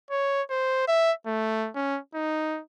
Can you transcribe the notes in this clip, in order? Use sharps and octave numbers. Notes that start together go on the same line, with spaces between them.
C#5
C5
E5
A3
C#4
D#4